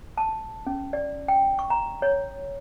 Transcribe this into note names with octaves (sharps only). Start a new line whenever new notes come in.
A5
C#4
D5
G5
C#6
A#5
C#5